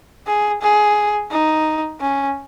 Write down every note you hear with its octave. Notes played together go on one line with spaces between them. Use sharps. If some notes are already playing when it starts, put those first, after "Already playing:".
G#4
G#4
D#4
C#4